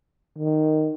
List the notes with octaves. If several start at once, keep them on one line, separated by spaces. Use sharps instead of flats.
D#3